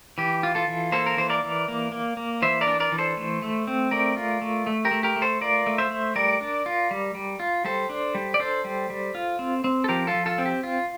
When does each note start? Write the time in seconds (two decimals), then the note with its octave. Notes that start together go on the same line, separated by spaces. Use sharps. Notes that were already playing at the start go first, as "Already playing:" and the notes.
0.18 E3 G4
0.43 F4
0.55 F4 A4
0.68 E3
0.92 A#3 A4 C5
1.06 A#4
1.17 E3 C5
1.30 A#4 D5
1.43 E3
1.68 A#3
1.92 A#3
2.17 A#3
2.42 E3 C5 E5
2.61 A#4 D5
2.67 D4
2.80 A#4 D5
2.92 E3
2.98 A4 C5
3.17 A3
3.42 A3
3.67 C4
3.91 A3 A#4 D5
4.17 F4
4.42 A3
4.67 A3
4.85 G4 A#4
4.91 A3
5.03 G4 A#4
5.16 A3
5.22 A4 C5
5.41 F4 A#4 D5
5.67 A3
5.78 C5 E5
5.91 A3
6.15 G3 A#4 D5
6.41 D4
6.66 F4
6.91 G3
7.15 G3
7.40 F4
7.64 G3 A4 C5
7.89 D4
8.15 G3
8.34 D5
8.39 D4 A4 C5
8.64 G3
8.90 G3
9.15 F4
9.39 C4
9.64 C4
9.84 A4
9.88 F3 G4 A#4
10.07 F4 A4
10.14 F3
10.26 F4 A4
10.38 C4
10.45 G4
10.63 F4